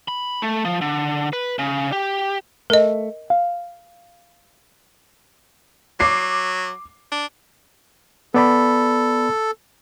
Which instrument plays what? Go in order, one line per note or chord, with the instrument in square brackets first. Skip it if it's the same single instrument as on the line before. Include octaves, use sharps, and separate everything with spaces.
[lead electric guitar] B5
A3
F3
D3
B4
C#3
G4
[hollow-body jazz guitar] A3 [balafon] A#4 D#5
[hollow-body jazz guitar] F5
[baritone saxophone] F#3 [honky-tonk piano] D6 C7
[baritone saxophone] D4
[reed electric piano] B3 D5 B5 [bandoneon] A4